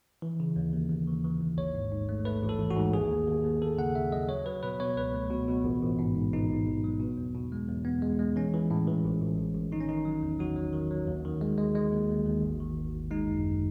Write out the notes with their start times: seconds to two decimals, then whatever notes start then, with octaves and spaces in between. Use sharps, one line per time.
0.22 E3
0.40 C#3
0.56 D#2
0.73 D#2
0.90 D#2
1.08 E3
1.25 E3
1.41 D#2
1.57 A1 C#5
1.75 G#2
1.92 G#2
2.09 A3
2.25 A3 B4
2.43 A1
2.49 A4
2.59 E3
2.71 F#4
2.76 G#2
2.93 D#2 G#4
3.10 D#2
3.27 D#2
3.44 D#2
3.62 D#2 A4
3.78 C#3 F#5
3.95 C#3 E5
4.12 F#3 D#5
4.29 F#3 C#5
4.46 F#3 B4
4.63 B2 B4
4.80 B2 C#5
4.96 C#2 B4
5.14 A3
5.30 B2
5.48 B2
5.64 A1
5.82 A1
5.99 G#2
6.15 G#2
6.33 A1 D#4
6.50 A1
6.67 A1
6.84 F#3
7.00 B2
7.17 E2
7.34 B2
7.52 G#3
7.69 E2
7.85 B3
8.02 G#3
8.19 G#3
8.36 E3 C#4
8.54 E3
8.71 A2
8.87 E3
9.05 A1
9.21 A1
9.38 A1
9.55 A1
9.72 D#3 D#4
9.80 C#4
9.88 D#3 D#4
10.05 F#3
10.22 E2
10.39 F#3 F#4
10.56 F#3
10.73 D#3
10.91 F#3
11.07 D#2
11.25 D#3
11.41 G#3
11.58 G#3
11.75 G#3
11.92 D#2
12.10 D#2
12.26 D#2
12.43 G#1
12.60 D#3
12.77 G#1
12.94 G#1
13.11 G#3 D#4
13.28 F#2
13.44 F#2